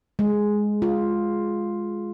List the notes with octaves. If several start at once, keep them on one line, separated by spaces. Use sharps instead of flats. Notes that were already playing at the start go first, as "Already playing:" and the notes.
G#3
F4